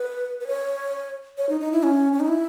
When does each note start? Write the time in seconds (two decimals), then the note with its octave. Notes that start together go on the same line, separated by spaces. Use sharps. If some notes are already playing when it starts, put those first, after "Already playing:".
Already playing: B4
0.40 B4
0.47 C#5
1.37 C#5
1.49 D#4
1.61 D#4
1.72 E4
1.83 C#4
2.13 C#4
2.20 D#4
2.28 E4